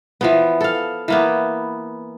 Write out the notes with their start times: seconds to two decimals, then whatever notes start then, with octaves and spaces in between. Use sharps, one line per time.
0.21 E3 F3 B3
0.61 A4 F5
1.08 E3 A#3 B3